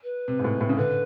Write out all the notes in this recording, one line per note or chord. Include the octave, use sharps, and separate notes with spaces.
B4
C3
G#2
A2
A2
C#3
D3 B4